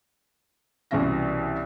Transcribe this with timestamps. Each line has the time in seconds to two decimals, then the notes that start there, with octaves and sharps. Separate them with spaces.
0.91 C2 B2 E3 C#4 E5 A#6